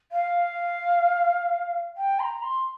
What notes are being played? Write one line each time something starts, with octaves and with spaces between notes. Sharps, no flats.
F5
G5
C6
A#5
C6